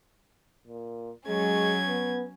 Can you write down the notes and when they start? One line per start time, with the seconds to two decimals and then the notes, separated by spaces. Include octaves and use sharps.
0.67 A#2
1.27 F#3 G#3 C#4 G#6
1.87 B3